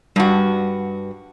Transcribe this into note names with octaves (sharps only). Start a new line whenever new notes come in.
G2 G3 F#4